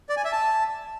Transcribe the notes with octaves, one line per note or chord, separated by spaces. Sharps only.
D5
G#5
E5
A5